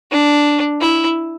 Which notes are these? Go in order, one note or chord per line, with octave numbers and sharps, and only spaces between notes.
D4
E4